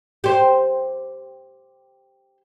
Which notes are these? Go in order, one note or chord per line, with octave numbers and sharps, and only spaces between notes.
G4 C5